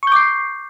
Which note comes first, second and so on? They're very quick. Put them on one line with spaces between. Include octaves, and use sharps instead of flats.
C#6 G6 D6 C7